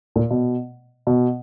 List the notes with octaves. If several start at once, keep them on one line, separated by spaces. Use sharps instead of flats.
A#2
B2
B2